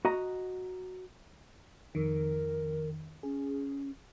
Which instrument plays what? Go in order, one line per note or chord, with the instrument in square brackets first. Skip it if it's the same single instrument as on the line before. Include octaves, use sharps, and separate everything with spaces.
[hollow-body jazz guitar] F#4 D#5 A#5
[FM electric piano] F2 D#3 [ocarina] A#4
[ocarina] C#4 [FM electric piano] G#4